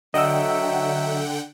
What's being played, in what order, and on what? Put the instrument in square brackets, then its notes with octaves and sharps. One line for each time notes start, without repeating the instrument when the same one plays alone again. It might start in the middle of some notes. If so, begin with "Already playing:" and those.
[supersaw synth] D3 F#5 G5 [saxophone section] F#3 E5 [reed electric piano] D#5 E6